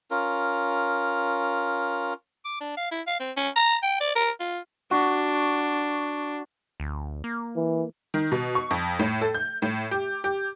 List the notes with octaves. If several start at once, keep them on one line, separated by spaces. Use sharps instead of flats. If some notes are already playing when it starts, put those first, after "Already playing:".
C#4 F4 A#4
D6
D4
F5
E4
F5
C4
C#4
A#5
G5
D5
A#4
F4
D4 F#4
D2
A#3
E3
D#3
B2
C#6
F2
A2
A4
G6
A2
G4
G4